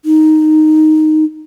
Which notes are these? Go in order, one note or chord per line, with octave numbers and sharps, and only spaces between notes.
D#4